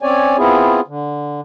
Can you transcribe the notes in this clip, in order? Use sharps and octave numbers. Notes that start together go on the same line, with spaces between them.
C4 C#4 C#5 D5 G#5
B3 C4 E4 F4 G#4
D3